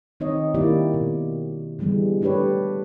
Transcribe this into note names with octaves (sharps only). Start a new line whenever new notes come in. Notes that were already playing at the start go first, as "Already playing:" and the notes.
D#3 C4 D#4 C#5 D#5
D#3 A#3 E4 G4 D5
B2
D3 E3 G3 G#3 B3
A3 D4 G4 B4 C#5